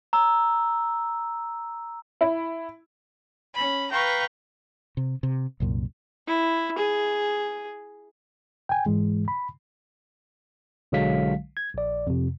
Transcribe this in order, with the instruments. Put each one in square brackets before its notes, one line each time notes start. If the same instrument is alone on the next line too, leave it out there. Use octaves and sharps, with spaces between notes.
[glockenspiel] A#5 E6
[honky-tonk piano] E4
[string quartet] C#4 B5
B4 F5 G5 A#5 C#6
[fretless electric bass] C3
C3
C2 F#2 A#2
[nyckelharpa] E4
G#4
[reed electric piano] G5 G#5
G#2 E3 G#3
B5
[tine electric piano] B1 D3 F#3 G#3 F5 B6
G#6
A#1 D5
F2 C3